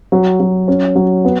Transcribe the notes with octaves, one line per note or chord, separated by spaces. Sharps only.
F#3
F#3
C#4
F#3
B3